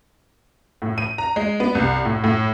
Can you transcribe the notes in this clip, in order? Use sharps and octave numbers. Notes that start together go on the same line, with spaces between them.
A2
D#7
A#5
G#3
B3
C2
A2
A2